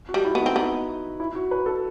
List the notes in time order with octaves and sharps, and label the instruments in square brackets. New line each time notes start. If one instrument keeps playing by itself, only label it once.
[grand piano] F#4
[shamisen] G3
[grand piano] E4
[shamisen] B3
[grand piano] D#4
[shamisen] C4
[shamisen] B3 [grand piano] D#4
[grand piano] E4
F#4
B4
A4